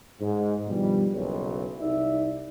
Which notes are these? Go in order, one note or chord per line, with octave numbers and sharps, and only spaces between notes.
G#2
G2 B2 D#3 F3 G3
F#1 B1
C2 D#4 D5 E5